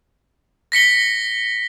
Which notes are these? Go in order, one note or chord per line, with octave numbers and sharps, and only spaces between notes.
A#6 B6 C#7 G7